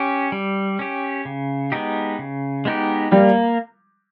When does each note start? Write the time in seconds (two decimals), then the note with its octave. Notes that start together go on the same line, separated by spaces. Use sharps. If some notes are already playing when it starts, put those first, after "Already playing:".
Already playing: C#4 G4
0.32 G3
0.79 C#4 G4
1.25 C#3
1.72 G#3 B3 D#4 G4
2.19 C#3
2.65 G#3 B3 D#4 G4
3.12 G3 A#3